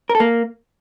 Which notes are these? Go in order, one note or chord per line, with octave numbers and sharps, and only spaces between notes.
A#4
A4
A#3